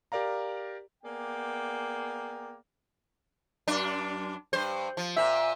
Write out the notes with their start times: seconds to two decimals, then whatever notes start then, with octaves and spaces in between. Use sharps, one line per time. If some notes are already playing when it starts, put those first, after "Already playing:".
0.12 G4 A#4 D5 F5 A#5
1.04 A#3 B3 G#4 D5 G5
3.68 F#2 D4
4.53 G2 C5
4.97 F3
5.17 A#2 C4 E5